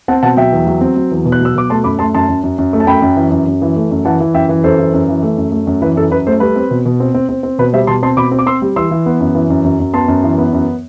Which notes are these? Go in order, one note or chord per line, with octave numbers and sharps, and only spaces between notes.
C4 F#5 A5
B2 F#5 A5
F#3 E5 G5
E2
F#3
C4
F#3
E2
B2
F#6
F#3 E6
B2 D6
A3 A5 C6
F#2 B5 D6
A3 A5 C6
F#2 A5 C6
F#2
F#2
F#2
A3
A5
F#2 G5 B5
F#2
E3
F#2
F#2
E3
A3
F#2
E3 F#5 A5
E3
F#2 E5 G5
E3
F#2 A4 C5
E3
F#2
E3
A3
F#2
A3
F#2
E3 B4
F#2 A4
F#2 B4
A3 A4 C5
G3 B4
C4
B2
B2
C4
C4
C4
C4
B2 B4
G3 C5 E5
B2 A5 C6
C4 A5 C6
B2 B5 D6
C4
D6
C4 C6 E6
G3
E3 C6 E6
E3
B3
F#2
E3
F#2
F#2
F#2
B3 A5 C6
F#2
E3
B3
F#2